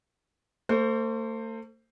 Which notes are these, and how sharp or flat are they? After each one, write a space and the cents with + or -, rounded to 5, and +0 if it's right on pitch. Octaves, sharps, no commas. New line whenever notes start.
A3 +40 C5 +5